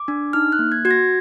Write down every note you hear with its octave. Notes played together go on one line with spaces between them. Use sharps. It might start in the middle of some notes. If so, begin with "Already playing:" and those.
Already playing: D6
D4
D#4 F6
F#6
A#3
G#6
F#4 G#6
A#6